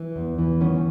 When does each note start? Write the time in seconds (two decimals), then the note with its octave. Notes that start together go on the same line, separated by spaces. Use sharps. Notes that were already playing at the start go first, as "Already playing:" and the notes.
Already playing: E3
0.16 E2
0.38 E3
0.61 D#3 B3 C#4